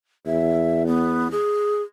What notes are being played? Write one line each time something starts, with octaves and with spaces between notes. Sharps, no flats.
E2 E5
B3
G#4